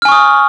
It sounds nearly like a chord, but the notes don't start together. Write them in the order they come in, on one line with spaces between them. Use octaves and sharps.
F6 G#5 C#6 D#6